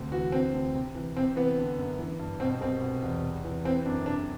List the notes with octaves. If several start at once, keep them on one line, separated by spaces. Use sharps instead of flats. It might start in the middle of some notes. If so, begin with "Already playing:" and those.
Already playing: D2 C3
E3 F#4
D3 C4
D2
C3
E3
C3 C4
E3 B3
D3
F#2
E3
G2
B2 C4
C2 C4
B2
E2
C3
E3
E3 C4
F#2 D4
C3 D4